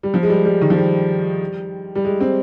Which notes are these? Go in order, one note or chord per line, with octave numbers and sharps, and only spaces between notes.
G3
F3
G#3
G3
G3
D#3
F3
G3
G3
G#3
C4